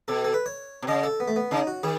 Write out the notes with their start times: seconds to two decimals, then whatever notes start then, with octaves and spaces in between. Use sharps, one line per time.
0.08 B2 A4
0.24 A4
0.34 B4
0.46 C#5
0.82 B2
0.87 C#3 D#5
1.03 A4
1.20 B3
1.28 A3
1.36 B3
1.51 C#3 D#4
1.67 F#4
1.83 D#3 G#4